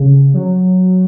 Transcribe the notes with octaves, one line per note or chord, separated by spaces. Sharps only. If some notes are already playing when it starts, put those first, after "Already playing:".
Already playing: C#3
F#3